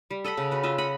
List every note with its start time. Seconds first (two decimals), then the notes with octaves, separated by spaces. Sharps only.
0.11 G3
0.24 A4 D#5 F#5 B5
0.37 C#3
0.51 F#4 B4
0.63 F4 D#5 E5
0.78 D#5 F#5 B5